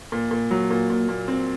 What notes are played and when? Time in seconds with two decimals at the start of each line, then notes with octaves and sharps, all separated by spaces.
0.12 A#2
0.31 A#2
0.51 F#3
0.71 A#2
0.90 A#2
1.09 A#2
1.28 C4